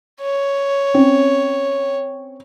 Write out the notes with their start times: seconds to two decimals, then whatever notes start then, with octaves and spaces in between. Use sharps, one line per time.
0.22 C#5
0.94 C4 C#4